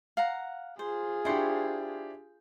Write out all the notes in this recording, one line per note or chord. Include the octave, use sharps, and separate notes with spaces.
F5 F#5 A#5
F4 G#4 C5
D4 E4 G4 C5 C#6